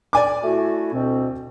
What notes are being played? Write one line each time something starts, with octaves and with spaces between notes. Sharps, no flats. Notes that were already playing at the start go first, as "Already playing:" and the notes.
D5 G#5 D6
A3 E4 F#4
D2 B2 C4